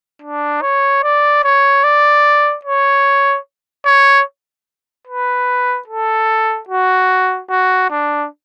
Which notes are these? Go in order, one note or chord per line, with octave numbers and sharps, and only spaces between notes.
D4
C#5
D5
C#5
D5
C#5
C#5
B4
A4
F#4
F#4
D4